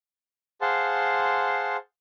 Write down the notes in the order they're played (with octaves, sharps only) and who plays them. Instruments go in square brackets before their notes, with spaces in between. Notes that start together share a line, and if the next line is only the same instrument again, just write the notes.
[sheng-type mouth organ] G#4 C5 F5 F#5 A5 C6